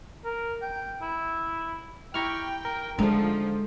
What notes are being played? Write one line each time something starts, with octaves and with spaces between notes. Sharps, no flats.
A#4
G5
E4
E4 G4 G5 A#5 C#6 F6
A#4
D3 F3 G#3 A3 D#4